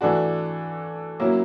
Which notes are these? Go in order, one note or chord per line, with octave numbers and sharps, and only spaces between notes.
E3 A3 D4 F#4
F#3 A#3 C#4 E4